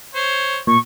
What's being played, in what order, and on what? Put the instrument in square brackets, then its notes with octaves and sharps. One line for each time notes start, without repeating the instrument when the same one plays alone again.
[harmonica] C5 C#5
[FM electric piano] A#2 [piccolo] C#6